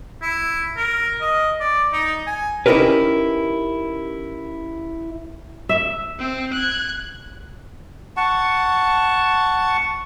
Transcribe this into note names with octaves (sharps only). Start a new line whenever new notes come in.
E4
A#4
D#5
D5
D#4
G#5
C#4 D#4 E4 G4 A#4 B4
E5
C4
F#6 G#6
F#5 A5 C#6